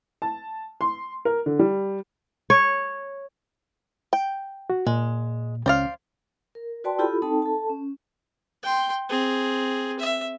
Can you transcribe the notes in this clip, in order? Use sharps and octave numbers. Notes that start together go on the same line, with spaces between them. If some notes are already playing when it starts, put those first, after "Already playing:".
A5
C6
A#4
D3
G3
C#5
G5
F#4
A#2 G#3
C#2 C#4 C5 D5 F5
A#4
F#4 B4 D5 G5 A5 C6
E4 F4 G4 A4 B5
C4 D#4 A4 G5 A5
A4 A5
C#4
G5 C6
C4 G#4
E5